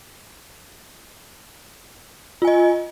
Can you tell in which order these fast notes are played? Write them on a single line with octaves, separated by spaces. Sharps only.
F4 G#5 D#5